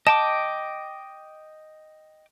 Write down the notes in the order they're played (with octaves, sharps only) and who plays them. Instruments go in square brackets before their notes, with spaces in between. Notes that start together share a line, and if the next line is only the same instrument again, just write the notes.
[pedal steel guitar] D#5 G5 D6 [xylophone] A5